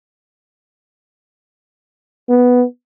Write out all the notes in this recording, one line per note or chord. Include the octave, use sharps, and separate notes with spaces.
B3